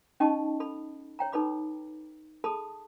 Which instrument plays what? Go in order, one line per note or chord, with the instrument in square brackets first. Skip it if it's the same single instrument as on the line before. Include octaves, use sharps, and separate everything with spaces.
[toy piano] C#4 D#4 D#5 G5 A5 C#6
A4 B5
C#5 G5 A#5
D#4 A4 B4 B5 D6
G#4 A4 A5 B5 D#6